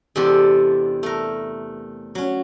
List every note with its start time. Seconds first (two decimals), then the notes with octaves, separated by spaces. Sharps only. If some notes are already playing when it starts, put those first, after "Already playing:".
0.16 E2 C3 G#3 D4 G4 A4
1.03 A3 A#4
2.15 F#3 C#4